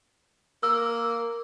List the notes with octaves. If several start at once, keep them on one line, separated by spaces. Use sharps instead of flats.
A#3 E6